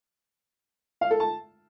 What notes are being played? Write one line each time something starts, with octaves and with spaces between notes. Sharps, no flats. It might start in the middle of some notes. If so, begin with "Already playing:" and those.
F5
A4
A5